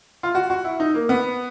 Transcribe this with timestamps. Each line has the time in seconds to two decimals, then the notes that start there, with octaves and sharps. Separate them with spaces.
0.23 F4
0.35 F#4
0.50 F#4
0.64 E4
0.80 D#4
0.94 A#3
1.09 B3